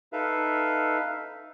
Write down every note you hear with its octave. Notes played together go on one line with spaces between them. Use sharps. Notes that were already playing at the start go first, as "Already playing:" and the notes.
D#4 A4 B4 E5 F5